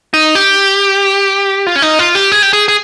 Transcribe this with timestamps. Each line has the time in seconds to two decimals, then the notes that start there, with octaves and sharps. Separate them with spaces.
0.14 D#4
0.35 G4
1.67 F4
1.76 C#4
1.82 D#4
1.99 F4
2.15 G4
2.32 G#4
2.42 G4
2.53 G#4
2.68 G#4